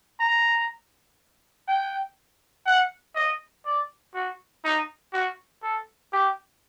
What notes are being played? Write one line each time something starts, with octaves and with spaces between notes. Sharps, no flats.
A#5
G5
F#5
D#5
D5
F#4
D#4
F#4
A4
G4